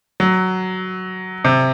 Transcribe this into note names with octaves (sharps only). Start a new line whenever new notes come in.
F#3
C3